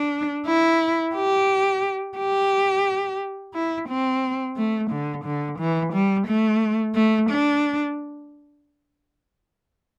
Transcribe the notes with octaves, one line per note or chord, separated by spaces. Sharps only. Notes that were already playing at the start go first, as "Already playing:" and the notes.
Already playing: D4
E4
G4
G4
E4
C4
A3
D3
D3
E3
G3
A3
A3
D4